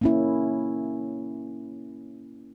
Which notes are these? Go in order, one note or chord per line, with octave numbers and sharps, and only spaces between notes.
A#3 C#4 E4